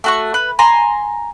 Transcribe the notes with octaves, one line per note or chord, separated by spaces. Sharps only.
A3 F#4 C#6
B4
G#5 A#5 C6